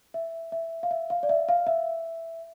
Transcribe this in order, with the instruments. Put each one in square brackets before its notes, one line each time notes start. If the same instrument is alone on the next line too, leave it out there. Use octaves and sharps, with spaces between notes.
[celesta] E5
E5
F5
E5
F5
D5
E5
F5
E5